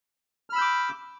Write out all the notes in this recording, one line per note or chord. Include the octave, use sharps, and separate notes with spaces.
B5 D6 E6 F6 G6